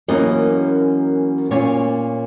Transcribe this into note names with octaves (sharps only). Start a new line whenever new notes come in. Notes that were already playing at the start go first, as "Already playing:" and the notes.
F#2 E3 A#3 C#4 D#5
A#2 A#3 C#4 C#5